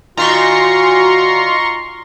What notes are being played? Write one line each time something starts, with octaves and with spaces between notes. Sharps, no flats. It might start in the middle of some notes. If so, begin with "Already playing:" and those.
A#2 D#3 F4 F#4 A#5 C6 C#6